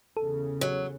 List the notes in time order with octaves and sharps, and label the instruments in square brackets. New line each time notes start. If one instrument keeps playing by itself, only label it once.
[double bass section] E2 C#3 [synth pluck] A4
[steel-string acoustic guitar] F#3